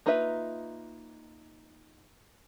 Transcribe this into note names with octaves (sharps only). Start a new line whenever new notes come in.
A#3 D#4 F4 B4 E5